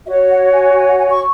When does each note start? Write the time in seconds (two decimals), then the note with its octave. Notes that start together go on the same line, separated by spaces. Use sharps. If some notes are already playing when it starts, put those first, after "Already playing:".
0.05 F#4 C#5 E5
0.29 F#5
0.52 G#5
0.75 G#5
0.86 F#5
0.97 G#5
1.09 C#6